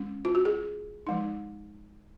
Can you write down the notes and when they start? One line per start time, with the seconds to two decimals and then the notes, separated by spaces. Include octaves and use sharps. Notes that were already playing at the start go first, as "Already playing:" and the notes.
Already playing: G#3 C#4
0.25 F4
0.35 F#4
0.45 G#4
1.07 F3 G#3 D#4